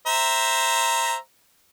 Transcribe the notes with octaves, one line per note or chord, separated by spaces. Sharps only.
C5 E5 A#5